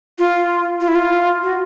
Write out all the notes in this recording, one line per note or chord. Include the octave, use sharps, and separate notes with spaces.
F4
F4
E4
F4
F#4